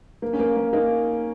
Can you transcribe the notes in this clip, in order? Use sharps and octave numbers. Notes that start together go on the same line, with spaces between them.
A#3
C#4
A#3
A#3
A#3 D#4